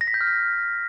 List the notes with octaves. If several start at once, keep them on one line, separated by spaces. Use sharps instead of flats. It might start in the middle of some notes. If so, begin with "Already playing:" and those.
A#6
B6
G6
F6
B6